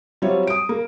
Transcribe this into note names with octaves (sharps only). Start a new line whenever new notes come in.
F#3 G3 C4 F4 C#5 E5
D#6 D7
A#3